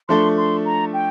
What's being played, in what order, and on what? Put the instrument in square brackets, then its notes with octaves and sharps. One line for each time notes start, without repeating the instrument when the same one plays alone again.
[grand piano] F3 A3 D4 A4 [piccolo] C6
[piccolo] C6
A#5
G5